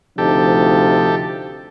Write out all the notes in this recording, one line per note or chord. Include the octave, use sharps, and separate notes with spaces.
D2 C3 F3 D#4 G4 A4